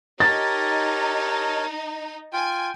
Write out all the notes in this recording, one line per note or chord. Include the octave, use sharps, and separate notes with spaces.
D#4 G4 A#4 C#5 A5 A6
F4 G5 G#5